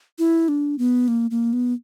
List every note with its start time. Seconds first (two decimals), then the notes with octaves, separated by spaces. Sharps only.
0.19 E4
0.48 D4
0.78 B3
1.08 A#3
1.31 A#3
1.53 B3